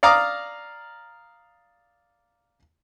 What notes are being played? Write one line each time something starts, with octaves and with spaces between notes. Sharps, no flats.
D5 F5 A#5 D6 D#6